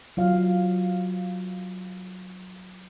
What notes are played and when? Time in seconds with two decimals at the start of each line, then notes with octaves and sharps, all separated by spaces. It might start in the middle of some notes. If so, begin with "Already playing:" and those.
0.17 F#3 F4 F5